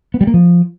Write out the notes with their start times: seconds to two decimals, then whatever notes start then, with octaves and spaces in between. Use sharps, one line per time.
0.14 B3
0.21 G3
0.27 A#3
0.34 F3